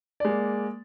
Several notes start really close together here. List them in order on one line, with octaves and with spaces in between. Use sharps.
D5 G#3 A#3